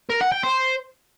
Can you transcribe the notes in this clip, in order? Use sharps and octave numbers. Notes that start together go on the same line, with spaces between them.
A#4
F#5
G5
C5